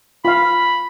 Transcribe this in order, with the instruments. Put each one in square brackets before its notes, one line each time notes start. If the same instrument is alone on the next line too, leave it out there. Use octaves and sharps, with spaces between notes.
[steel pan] F4 F5 [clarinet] B5